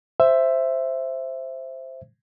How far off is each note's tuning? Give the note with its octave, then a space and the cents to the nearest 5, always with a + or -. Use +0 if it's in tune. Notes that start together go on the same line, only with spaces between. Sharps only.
C5 +0 E5 +10